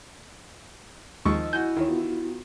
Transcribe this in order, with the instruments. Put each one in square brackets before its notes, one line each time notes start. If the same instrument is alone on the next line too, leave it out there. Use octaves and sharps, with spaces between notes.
[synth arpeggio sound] D#2 G#3 [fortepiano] D#3 F3 C#6 [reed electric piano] D#5 E6
[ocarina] E4 [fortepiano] F#4 G#5 [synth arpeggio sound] G6
[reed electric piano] D#2 D#4 C#5 [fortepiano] D#3 E3
[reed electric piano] B3 F4 F#4